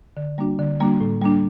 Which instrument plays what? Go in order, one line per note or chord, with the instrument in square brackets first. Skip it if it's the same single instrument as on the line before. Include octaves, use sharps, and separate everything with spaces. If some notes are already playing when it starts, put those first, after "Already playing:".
[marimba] D3
G3 A#3 D4 F#4
D3
G3 A#3 D4 F#4
A2
G3 A#3 D4